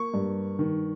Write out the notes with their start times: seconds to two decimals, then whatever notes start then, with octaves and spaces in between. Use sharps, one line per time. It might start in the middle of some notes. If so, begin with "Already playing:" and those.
Already playing: A#3 C#6
0.14 G2
0.59 D#3